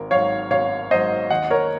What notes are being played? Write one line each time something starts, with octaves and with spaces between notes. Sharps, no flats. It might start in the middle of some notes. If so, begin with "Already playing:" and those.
Already playing: G#1 A#4
G#2 F#3 C#5 F5
G#1 C#5 F5
G#2 F#3 C5 D#5
D#2 D#5 F#5
A#4 C#5